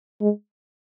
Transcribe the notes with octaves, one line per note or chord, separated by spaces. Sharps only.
G#3